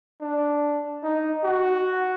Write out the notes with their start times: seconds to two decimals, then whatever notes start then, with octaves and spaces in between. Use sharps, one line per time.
0.21 D4
1.03 D#4
1.44 F#4